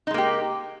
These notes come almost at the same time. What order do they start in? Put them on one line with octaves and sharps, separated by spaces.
D#4 G#3 A#3 G4